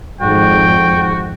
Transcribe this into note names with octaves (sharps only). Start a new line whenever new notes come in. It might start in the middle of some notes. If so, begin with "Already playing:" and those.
G#1 F2 F#4 G5